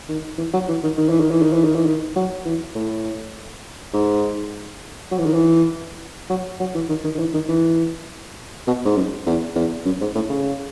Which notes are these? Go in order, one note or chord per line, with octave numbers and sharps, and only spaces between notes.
D#3
E3
F#3
E3
D#3
D#3
E3
D#3
E3
D#3
E3
D#3
E3
D#3
F#3
E3
A2
G#2
F#3
E3
D#3
E3
F#3
F#3
E3
D#3
D#3
D#3
E3
D#3
E3
B2
G#2
F#2
E2
E2
F#2
G#2
A2
C#3